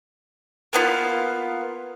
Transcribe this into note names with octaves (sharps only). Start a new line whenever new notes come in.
A#3 B3 E4 F4